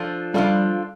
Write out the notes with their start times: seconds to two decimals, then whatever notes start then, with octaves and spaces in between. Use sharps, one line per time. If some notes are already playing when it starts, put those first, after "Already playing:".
Already playing: F3 D4 F4 A4
0.34 F3 G3 D4 F4 A4